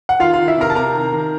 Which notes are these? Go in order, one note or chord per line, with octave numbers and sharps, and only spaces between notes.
F#5
D#3 F4 F5
F4 F5
D#3
E4 E5
C3 A#4 A#5
A5
C3 A#4 A#5
D#3
D#3